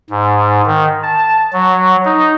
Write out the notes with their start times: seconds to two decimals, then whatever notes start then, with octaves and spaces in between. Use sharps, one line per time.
0.10 G#2
0.66 D#3
1.03 A5
1.53 F#3
2.05 D#4